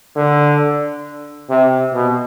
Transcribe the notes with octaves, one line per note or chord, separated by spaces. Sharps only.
D3
C3
B2